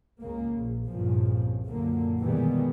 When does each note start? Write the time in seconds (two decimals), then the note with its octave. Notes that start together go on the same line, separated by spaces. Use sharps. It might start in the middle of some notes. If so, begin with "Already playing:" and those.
0.22 C#2 C#3 A#3
0.54 A#1
0.87 C2 G2 A#2 C#3 F3
1.66 F#2 A#2 D3 A#3
2.20 B2 D#3 E3 G3 G#3 B3